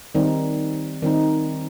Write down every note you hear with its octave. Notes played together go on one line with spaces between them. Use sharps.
D#3 G3 C4 D#4
D#3 G3 C4 D#4